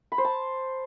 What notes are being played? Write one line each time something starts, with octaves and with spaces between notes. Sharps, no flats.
B5
C5
A5